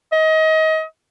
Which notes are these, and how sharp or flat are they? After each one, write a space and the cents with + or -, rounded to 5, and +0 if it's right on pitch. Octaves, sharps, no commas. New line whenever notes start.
D#5 +30